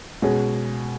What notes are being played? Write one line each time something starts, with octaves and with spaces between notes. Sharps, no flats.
B2 G#3 C#4 G#4